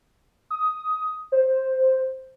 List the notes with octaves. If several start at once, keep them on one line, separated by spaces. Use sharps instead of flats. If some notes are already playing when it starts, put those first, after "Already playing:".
D#6
C5